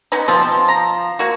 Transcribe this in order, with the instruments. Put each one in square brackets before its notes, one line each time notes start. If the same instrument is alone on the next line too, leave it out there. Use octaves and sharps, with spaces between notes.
[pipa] B3 C#4 D#4
[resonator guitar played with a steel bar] F3 F4 A5 [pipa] C4
[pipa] A#5
A#3 F#4